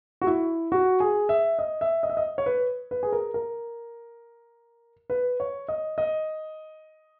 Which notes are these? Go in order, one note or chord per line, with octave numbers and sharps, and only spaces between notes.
F#4
E4
F#4
G#4
E5
D#5
E5
D#5
E5
D#5
C#5
B4
B4
G#4
A#4
A#4
B4
C#5
D#5
D#5